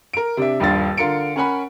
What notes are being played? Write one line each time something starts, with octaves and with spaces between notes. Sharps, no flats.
A#4 D7
C3 D4 E5
D#1 A#1 G2 F4 A6
D3 F4 A#4 C#7 D7
C#4 A#4 F#5 G#5 B5